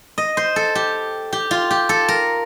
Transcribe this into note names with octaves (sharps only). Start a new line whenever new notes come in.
D#5
C5
A4
G4
G4
F4
G4
A4
A#4